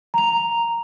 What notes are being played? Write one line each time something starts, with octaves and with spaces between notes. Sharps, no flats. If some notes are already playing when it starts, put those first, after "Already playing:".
A#5 F7